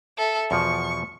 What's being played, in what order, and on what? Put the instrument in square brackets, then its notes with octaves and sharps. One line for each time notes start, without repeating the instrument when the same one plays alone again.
[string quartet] A4 E5
[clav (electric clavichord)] E2 B2 F3 [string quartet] C#6